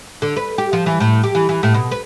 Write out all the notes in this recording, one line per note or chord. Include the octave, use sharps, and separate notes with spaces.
D3
B4
G4
F3
E3
A2
G4
E3
E3
A2
B2
B4